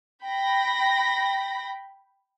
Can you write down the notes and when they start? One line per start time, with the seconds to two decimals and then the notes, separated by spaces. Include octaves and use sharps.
0.24 G5 B5 A#6